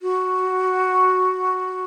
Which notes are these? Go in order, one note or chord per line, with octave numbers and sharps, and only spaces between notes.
F#4